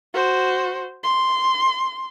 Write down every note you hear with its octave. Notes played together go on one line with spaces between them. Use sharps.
F#4 C5
C6